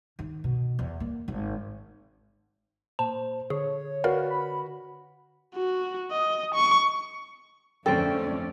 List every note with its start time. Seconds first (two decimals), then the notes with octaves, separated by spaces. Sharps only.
0.19 D#3
0.44 B2
0.79 E2
1.00 A#3
1.28 G#1
2.99 A#2 C5 A5
3.50 D3 G#4 C#5
4.04 F#4 A#4 B4 D5 F5
4.30 B5
5.55 F#4
6.11 D#5
6.54 C#6
7.86 F2 D3 A3 C4 C#4 A4 D5 G5